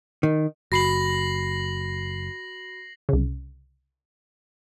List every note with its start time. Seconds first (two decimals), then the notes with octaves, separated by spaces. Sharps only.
0.23 D#3
0.72 F#1 F#4 B5 A#6 C7 F#7
3.09 C2 C#3